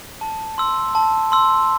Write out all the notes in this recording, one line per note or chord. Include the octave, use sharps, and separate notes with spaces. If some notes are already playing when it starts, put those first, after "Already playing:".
A5
C6 E6
A5
C6 E6